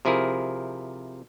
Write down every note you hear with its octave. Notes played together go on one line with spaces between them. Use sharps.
C3 F3 E4 G#4 A#4